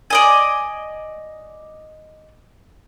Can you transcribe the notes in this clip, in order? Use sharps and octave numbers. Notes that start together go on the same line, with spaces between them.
D5 D#5 G#5